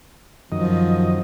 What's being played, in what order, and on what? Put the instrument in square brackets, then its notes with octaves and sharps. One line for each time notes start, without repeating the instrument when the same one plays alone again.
[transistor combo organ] F#2 D#3 D#5 [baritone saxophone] F3